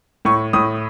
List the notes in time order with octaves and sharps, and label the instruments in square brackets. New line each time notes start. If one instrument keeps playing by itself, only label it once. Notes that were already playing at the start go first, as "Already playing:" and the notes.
[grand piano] A2 C#6
A2 D#6